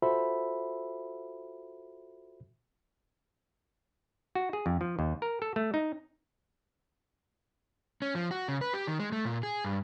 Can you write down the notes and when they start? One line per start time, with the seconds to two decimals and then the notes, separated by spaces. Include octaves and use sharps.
0.02 F4 F#4 A4 C5 E5 B5
4.35 F#4
4.53 G#4
4.66 F2
4.81 F3
4.99 D#2
5.22 A#4
5.42 A4
5.56 A3
5.74 D#4
8.02 C#4
8.15 F3
8.31 F#4
8.48 C#3
8.61 B4
8.74 G4
8.87 D#3
9.00 G#3
9.12 A3
9.25 A#2
9.43 G#4
9.65 G2